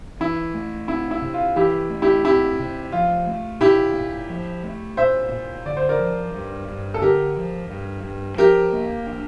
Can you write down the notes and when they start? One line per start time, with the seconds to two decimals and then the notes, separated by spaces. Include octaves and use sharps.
0.20 E3 E4
0.54 A3
0.88 C4 E4
1.11 E4
1.22 C3
1.34 F4
1.56 E3 E4 G4
1.90 A3
2.02 E4 G4
2.25 C4 E4 G4
2.59 C3
2.92 F3 F4
3.27 A3
3.61 A#2 E4 G4
3.96 A#2
4.30 F3
4.63 A3
4.97 A#2 C5 E5
5.31 A#2
5.66 D3 D5
5.77 C5
5.89 A#4 D5
5.99 F3
6.34 G2
6.69 G2
6.94 A4
7.01 D3 G4 A#4
7.36 F3
7.70 G2
8.04 G2
8.38 F3 G4 A#4
8.72 A#3
9.06 D4